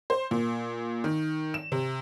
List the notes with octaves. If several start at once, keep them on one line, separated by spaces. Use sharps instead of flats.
C5
A#2
D#3
E7
C3